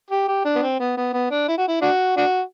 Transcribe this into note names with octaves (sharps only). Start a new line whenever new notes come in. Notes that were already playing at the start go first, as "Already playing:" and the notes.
G4
G4
D4
B3
C4
B3
B3
B3
D4
E4
F#4
E4
D4 F#4
D4 F#4